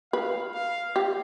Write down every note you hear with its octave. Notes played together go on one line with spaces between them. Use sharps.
B4 F5
F5
G4